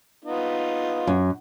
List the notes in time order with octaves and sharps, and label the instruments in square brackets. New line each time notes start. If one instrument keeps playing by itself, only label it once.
[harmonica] B3 D#4 F4
[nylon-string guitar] F#2